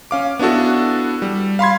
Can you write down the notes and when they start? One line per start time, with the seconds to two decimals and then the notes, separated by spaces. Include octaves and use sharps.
0.11 C#4 F5 D6
0.39 B3 D4 E4 F#4 A4
1.22 G3
1.59 F5 B5 C6 G#6